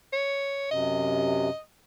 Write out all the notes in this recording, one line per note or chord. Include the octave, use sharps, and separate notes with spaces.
C#5
F#2 C3 D#5